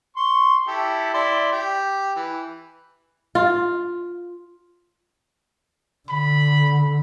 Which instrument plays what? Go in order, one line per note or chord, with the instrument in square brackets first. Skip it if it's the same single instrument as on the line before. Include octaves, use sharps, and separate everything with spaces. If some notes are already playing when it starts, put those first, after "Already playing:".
[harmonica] C6 C#6
E4 G4 A4
E4 D5 C6
G4
E3
[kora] F4
[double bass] D3 [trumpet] B5